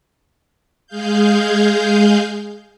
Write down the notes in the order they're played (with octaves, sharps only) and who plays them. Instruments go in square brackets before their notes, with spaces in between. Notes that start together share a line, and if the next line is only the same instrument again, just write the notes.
[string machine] G#3 G#4 F5 G6